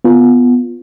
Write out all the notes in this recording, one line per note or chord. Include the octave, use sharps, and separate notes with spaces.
B3 F4